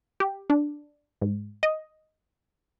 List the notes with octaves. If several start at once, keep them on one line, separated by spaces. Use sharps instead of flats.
G4
D4
G#2
D#5